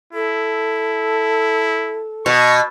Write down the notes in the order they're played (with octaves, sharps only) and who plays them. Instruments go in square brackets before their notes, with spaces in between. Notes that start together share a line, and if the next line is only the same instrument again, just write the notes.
[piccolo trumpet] E4 [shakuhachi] A4
[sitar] B2 [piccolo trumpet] C#6